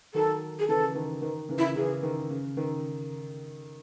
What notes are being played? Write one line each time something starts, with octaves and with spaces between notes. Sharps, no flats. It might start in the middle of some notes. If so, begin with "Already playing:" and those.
D#3 F#3 A4
G#4
C#3 E3 A4
D#3
D#3
C#3 E3
E4
C#3 E3 G#4
D#3
C#3
D#3